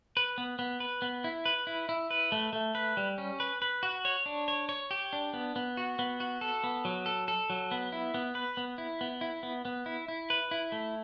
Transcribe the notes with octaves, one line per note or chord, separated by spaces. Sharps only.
B4
B3
B3
B4
B3
E4
B4
E4
E4
B4
A3
A3
B4
G3
C#4
B4
B4
F#4
C#5
D4
C#5
C#5
G4
D4
B3
B3
F#4
B3
F#4
A4
B3
F#3
A4
A4
F#3
B3
E4
B3
B4
B3
E4
B3
E4
B3
B3
E4
E4
B4
E4
A3